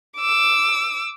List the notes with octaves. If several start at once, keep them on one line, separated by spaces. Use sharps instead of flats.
D6 E6